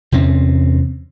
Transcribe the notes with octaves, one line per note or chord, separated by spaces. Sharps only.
E2 C3 C4 C#4